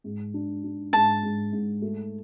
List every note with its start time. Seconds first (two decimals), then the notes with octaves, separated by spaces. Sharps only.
0.04 G#2
0.34 D4
0.64 D4
0.93 G#2 A5
1.23 G#2
1.52 G#2
1.82 A3